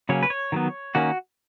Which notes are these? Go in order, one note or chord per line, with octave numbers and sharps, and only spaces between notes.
C#3 F#3 A#3 C#4 C#5
B4
C#5
D#3 F#3 B3
D#3 A#3 C#4 F#4